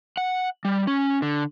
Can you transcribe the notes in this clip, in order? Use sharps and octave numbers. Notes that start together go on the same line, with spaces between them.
F#5
G3
C#4
D3